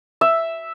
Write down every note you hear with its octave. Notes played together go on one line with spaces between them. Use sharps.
E5